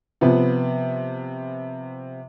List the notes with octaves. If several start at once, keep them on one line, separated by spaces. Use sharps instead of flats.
C3 F3 B3